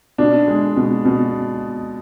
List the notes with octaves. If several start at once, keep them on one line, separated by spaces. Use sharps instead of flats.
B2 D4
G#3
B2
B2